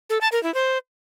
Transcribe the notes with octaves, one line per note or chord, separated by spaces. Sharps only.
A4
A5
A#4
E4
C5